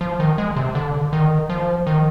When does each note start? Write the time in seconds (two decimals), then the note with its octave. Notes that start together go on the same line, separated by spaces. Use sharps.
0.01 F3
0.20 D#3
0.38 G#3
0.56 C3
0.75 D3
1.13 D#3
1.50 F3
1.87 D#3